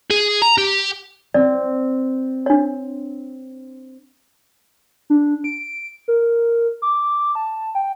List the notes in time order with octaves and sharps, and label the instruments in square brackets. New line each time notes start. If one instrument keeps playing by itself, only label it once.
[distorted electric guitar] G#4
A#5
G4
[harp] C4 [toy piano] D5
[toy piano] D4 C#5
[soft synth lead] D4
D7
A#4
D6
A5
G5